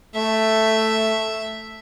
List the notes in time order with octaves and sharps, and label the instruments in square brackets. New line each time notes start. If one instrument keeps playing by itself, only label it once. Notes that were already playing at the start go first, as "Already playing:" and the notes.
[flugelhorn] A3 [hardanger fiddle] E5